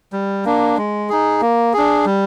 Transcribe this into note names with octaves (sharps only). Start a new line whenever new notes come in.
G3
A#3 D4
G#3
D#4 G#4
A#3
D4 G#4
G3